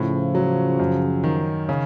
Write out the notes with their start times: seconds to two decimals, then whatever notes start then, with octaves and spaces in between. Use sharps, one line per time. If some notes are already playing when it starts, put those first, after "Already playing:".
Already playing: A2 C#3 F3
0.35 F#3
0.79 F#2
1.24 D#3
1.69 C#3